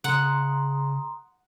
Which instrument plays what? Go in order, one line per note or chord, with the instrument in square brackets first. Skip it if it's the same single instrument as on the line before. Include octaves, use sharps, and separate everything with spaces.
[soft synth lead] C#3 [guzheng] F#5 [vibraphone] A#5 C6 D#6